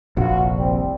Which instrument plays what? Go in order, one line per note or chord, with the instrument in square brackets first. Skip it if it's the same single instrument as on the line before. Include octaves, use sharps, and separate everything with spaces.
[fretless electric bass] F1 A#1 [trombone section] F4 F#4
[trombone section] C2 G3 C4